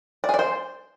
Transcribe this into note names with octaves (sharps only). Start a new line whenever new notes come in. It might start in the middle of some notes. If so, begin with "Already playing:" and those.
D5
G#4
D5
C5